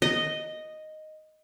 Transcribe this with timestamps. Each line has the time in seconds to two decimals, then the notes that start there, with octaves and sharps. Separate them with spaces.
0.02 D#5